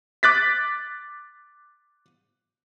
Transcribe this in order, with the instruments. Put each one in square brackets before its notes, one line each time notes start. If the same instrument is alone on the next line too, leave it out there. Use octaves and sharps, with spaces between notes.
[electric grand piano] D6 F#6 A6 B6